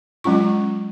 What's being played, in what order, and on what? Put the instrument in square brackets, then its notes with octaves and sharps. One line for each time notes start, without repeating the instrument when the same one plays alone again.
[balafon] F#3 G#3 C#4 F4 C#6